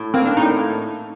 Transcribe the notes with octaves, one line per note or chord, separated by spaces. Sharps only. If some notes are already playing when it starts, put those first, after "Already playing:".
Already playing: A2
A#3 C4
D4
A2 D#4